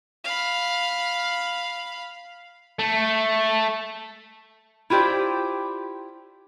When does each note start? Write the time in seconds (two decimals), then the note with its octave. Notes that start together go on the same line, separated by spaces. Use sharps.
0.24 F5 B5
2.79 A3
4.90 E4 F4 G4 C5 D5